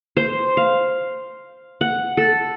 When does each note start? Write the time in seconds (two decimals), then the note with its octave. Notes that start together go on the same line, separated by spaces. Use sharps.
0.17 C5
0.57 F5
1.81 F#5
2.17 A4